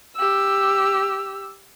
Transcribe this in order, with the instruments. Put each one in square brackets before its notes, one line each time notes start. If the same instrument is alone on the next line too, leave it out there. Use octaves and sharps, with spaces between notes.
[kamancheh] G4 E6